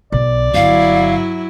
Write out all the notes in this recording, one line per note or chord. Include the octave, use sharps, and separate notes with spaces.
B1 D5
G1 F#3 E4 F5